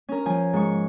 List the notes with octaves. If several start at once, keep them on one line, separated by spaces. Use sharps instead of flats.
C#4 A#4
F3 G#5
G#2 C#6